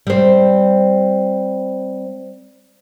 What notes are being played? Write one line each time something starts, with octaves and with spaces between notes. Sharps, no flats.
G3 C4